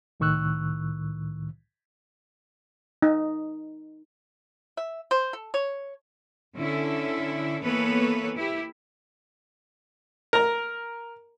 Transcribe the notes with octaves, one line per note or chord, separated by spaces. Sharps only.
C2 A2 D#3 C#6 E6 F#6
D#4
E5
C5
A4
C#5
D3 C#4 E4 A4
E3 A#3 B3 A4 B4 C#5
E4 G4
A#4 A#5